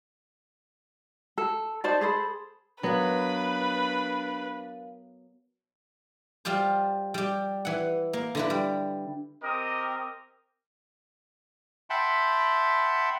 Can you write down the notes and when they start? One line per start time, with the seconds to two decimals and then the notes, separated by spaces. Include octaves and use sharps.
1.38 A4
1.84 D#4 C5 D5 A5
2.01 G#4 A4 C5 B5
2.83 F#3 B3 D4 A#4 B4 F5
6.45 G3 F4 G4 C5
7.14 G3 G4
7.65 E3 F#5
8.13 A#3
8.35 D3 E4 B4
8.50 G3
9.43 C4 G4 A#4 D#5 D#6
11.90 E5 F#5 G5 A5 B5 C6